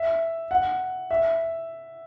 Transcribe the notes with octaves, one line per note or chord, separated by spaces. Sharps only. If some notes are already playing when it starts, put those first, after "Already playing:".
Already playing: E5
F#5
E5